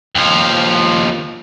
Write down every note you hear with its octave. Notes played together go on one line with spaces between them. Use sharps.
D#2 F3